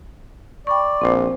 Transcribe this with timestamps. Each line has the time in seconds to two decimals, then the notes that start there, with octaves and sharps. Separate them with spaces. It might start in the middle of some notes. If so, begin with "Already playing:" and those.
0.67 D5 G5 B5 C#6
1.01 A#1 C4 C5